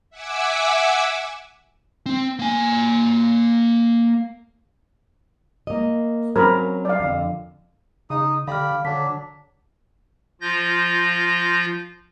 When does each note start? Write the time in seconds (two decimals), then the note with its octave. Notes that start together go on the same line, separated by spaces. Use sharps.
0.10 E5 F#5 G#5 D6 E6
2.06 C4
2.39 A#3 G#5
5.67 A#3 D#5
6.36 F#3 C4 C#4 A#4 C5 B5
6.85 D5 F5
6.99 F2 D3
8.10 C#3 D#4 D#6
8.47 D3 G4 D5 F5 B5 F6
8.85 D3 F#3 D4 B6
10.41 F3 F4 G6 A#6